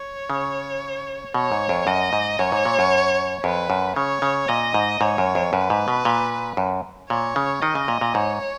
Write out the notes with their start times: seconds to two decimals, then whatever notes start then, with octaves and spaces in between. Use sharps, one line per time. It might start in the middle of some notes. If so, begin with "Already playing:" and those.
Already playing: C#5
0.30 C#3
1.34 B2 C#5
1.52 G#2
1.69 F2
1.87 F#2 D#5
2.13 G#2
2.39 F#2 C#5
2.52 G#2
2.65 A#2
2.79 F#2
3.44 F2 B4
3.70 F#2
3.96 C#3 C#5
4.22 C#3
4.48 A#2 D#5
4.74 G#2
5.01 G#2 C#5
5.18 F#2
5.35 F2
5.53 F#2 B4
5.70 G#2
5.88 B2
6.05 A#2
6.57 F#2
7.10 A#2 C#5
7.36 C#3
7.62 D#3 D#5
7.75 C#3
7.88 A#2
8.01 A#2
8.15 G#2 C#5